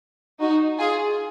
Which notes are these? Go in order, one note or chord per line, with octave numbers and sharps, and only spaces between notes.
D#4 F#4
F4 G#4